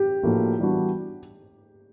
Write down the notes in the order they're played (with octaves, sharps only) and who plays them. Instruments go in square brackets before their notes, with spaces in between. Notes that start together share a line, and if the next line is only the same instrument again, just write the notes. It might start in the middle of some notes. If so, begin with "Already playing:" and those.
Already playing: [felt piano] G4
[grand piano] A2 F3 A#3 D4 F#4
E3 G3 B3 D4 F#4